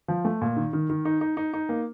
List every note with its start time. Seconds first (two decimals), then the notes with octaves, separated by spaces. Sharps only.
0.08 F3
0.25 A3
0.41 A#2
0.57 D#3
0.73 D#3
0.90 D#3
1.05 D#4
1.21 D#4
1.37 D#4
1.53 D#4
1.69 A#3